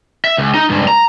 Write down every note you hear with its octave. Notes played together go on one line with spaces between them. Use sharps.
E5
C#2
D#4
C#2 G2
A#5